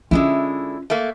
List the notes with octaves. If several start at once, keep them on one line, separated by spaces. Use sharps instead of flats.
D3 G#3 C#4 E4 F4
A3 A#3